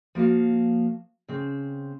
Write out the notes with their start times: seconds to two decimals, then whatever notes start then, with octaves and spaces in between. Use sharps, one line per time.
0.15 F3 A#3 F#4 F5
1.28 C#3 C4